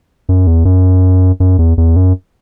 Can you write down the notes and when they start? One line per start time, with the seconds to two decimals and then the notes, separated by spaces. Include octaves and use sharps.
0.29 F#2
0.47 E2
0.65 F#2
1.40 F#2
1.59 E2
1.78 E2
1.96 F#2